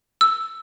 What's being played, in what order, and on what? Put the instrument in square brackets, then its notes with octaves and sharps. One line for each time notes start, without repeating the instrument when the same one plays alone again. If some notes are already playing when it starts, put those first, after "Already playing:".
[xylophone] E6